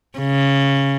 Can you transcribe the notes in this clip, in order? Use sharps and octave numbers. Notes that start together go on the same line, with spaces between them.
C#3